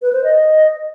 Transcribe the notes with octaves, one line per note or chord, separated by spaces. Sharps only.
B4
C5
D#5